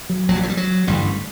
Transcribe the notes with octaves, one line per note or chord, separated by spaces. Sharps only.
F#3
A#1 A#2 F#3
G3
F#3
G3
F#3
A1 G2 D3 G3